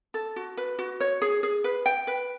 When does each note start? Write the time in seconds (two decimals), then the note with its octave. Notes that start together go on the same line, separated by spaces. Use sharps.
0.14 A4
0.36 F#4
0.57 B4
0.79 F#4
1.00 C#5
1.22 G#4
1.43 G#4
1.64 B4
1.86 G5
2.07 B4